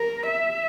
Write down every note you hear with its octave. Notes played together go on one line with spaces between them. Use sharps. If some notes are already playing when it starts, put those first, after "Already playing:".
Already playing: A#4
E5